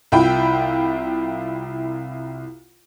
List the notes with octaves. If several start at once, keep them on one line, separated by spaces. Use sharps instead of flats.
C2 E4 F4 G5 B5